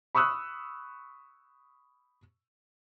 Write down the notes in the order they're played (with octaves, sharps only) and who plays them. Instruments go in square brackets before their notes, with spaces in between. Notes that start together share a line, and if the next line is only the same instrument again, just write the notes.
[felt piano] B5 C#6 D#6 E6 F#6